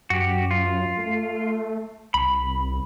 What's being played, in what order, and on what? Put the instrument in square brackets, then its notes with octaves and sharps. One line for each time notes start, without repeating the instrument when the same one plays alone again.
[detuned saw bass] F#2 [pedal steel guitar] F#4 G4
[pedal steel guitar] F4
[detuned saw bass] A3
[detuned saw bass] C2 [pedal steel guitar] B5